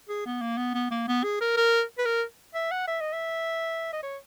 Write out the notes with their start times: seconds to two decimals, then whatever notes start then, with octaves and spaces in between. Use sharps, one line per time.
0.09 G#4
0.26 B3
0.41 A#3
0.58 B3
0.74 B3
0.91 A#3
1.08 B3
1.24 G#4
1.41 A#4
1.57 A#4
1.98 B4
2.05 A#4
2.54 E5
2.71 F#5
2.87 E5
3.01 D#5
3.13 E5
3.93 D#5
4.03 C#5